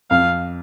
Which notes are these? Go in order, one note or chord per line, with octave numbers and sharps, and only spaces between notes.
F2 F5